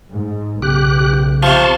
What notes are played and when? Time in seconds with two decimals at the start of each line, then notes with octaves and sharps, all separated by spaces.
0.12 G#2
0.62 B1 C#3 G4 F#6
1.43 C3 F3 A5 C6 C#6